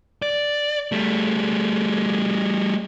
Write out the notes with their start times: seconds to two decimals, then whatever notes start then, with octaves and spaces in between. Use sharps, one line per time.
0.22 D5
0.92 G3 A3